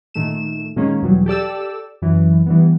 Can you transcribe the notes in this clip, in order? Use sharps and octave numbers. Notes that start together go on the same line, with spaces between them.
A#2 D#3 A3 E7
A#2 D#3 G#3 A#3 C#4
E2 B2 F#3 G3
G4 A4 D5 E6
F#2 E3
E3 G3 B3